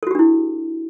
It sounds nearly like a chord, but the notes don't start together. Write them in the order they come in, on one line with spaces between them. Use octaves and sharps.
A4 F#4 G4 D4 E4